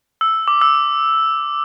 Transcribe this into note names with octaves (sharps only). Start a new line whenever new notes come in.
E6
D6
E6
D6